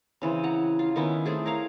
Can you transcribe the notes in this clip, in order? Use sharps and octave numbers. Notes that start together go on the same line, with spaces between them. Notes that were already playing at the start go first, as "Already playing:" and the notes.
C#3 E3 C4
F#5 A#5
F4
D#3 B3 C#4 E4
A3 C4 G#4
A#4 C#5 F5 A#5